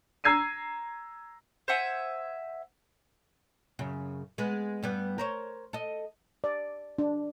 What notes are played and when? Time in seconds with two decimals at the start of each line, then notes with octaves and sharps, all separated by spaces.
0.24 A#5 E6 G#6 C7 D#7
1.68 C5 E5 F#5 G#5
3.79 F#2 C#3
4.38 G#3 B3
4.83 G2 G3 B3
5.18 A#4 C5 C#5
5.73 A4 D#5
6.44 D5
6.98 D4